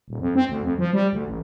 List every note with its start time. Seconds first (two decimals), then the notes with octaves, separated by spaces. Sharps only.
0.08 D#1
0.20 F2
0.35 C4
0.49 D2
0.63 F2
0.78 F3
0.93 G3
1.13 D2
1.26 A1